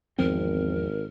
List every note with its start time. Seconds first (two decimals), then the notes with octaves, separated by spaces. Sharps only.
0.19 G#1 E2 F3 C4 A#4